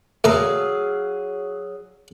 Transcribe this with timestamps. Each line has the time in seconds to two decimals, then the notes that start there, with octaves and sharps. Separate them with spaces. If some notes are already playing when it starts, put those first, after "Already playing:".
0.24 F#3 A3 G#4 F5 A#5